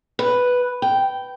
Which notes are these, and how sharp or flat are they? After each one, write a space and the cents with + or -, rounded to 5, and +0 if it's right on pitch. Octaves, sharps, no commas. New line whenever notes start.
B4 +0
G5 -10